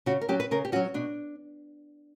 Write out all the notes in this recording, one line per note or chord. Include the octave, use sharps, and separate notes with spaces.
C#3 F#4
A#4
F#3 C#4 G4
B4
C#3 A#4
G4
F#3 C#4 F#4
B2 D4